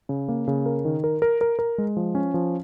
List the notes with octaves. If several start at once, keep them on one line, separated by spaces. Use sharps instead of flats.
C#3
A#3
C#3
A#4
D#3
A#4
A#4
A#4
A#4
G#3
F3
C#4
F3